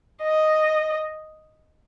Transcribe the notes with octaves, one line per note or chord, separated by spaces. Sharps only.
D#5